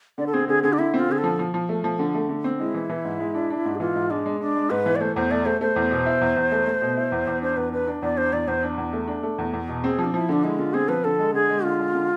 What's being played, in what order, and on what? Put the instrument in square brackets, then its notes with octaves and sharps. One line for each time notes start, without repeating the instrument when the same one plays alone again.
[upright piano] D3 [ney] D5
[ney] A4
[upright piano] C4 [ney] G#4
[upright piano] D3 [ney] G#4
[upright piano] D3 [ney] G#4
[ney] D4
[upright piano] D3 [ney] E4
[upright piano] C4
[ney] F4
[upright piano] D3 [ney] G#4
[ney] A4
[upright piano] F3
F3
F3
A3
F3
D3
A3
D3
C4
[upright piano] G#3 [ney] E4
[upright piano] E3
E3
G#2
G#3
D4
D4
G#2
[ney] G#4
[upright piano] E3 [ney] F4
[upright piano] G#2
[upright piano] G#3 [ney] D4
[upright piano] G#3
[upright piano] G#3 [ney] D4
[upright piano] G#3
[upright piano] G#2 [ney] B4
[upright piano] E3
[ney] D5
[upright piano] A3 [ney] C5
[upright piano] E2 [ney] C5
[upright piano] A3 [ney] D5
[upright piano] A3 [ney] C5
[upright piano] A3 [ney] C5
[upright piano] E2
B2
E4
E2
E2
A3
A3
B2
E4
E2
E2
[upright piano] D4 [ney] C5
[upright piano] E2 [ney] B4
[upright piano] D4 [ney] B4
[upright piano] D4
[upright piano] E2 [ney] D5
[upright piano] D4 [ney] C5
[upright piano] E2 [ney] D5
[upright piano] E2 [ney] C5
[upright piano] D4
E2
A3
D4
A3
E2
E2
B2
[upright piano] C4 [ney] G#4
[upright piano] F3
[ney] D4
[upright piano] F3 [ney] E4
[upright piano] D3 [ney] D4
[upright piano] G#3 [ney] E4
[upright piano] D3 [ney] F4
[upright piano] C4 [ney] G#4
[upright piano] F3 [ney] B4
[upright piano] D3 [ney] A4
[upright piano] G#3
[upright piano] D3 [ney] G#4
[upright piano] G#3
[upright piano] D3 [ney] F4
[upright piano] G#3
D3